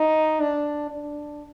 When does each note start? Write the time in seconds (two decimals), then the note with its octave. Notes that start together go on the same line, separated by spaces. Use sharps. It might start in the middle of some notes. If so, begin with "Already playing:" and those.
Already playing: D#4
0.40 D4
0.90 D4